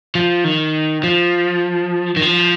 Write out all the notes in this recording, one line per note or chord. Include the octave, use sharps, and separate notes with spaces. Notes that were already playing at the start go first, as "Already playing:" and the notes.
F3
D#3
F3
D#3
F3